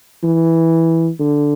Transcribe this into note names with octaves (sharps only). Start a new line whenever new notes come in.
E3
D3